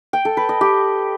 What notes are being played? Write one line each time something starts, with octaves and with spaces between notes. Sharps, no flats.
G5
A4
B4
D#5
G4